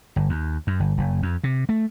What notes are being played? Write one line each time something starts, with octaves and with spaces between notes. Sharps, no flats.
G1
D#2
F#2
G1
F#1
F2
C3
A3